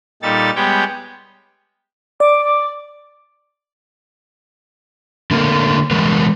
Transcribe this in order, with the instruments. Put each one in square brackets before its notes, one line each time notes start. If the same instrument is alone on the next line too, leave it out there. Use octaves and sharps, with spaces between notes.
[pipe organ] A#2 G3 D#4 A4 A6
G3 G#3 B3 C#5 G5
[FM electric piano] D5 [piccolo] D6
[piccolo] D6
[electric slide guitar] D3 A3 A#3 A#4
E3 G#3 A#4 B4